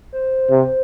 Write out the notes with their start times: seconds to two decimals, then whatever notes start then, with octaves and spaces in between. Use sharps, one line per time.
0.13 C5
0.51 C3